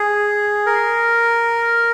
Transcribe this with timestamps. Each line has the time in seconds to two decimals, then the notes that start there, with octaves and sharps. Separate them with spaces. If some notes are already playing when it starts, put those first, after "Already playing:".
Already playing: G#4
0.66 A#4